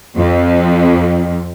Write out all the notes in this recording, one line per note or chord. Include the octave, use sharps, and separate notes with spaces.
F2